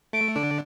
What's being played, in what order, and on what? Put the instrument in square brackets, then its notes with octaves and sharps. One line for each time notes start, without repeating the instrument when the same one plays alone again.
[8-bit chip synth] A3 [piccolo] D7
[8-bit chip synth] D3 D4 [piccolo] D7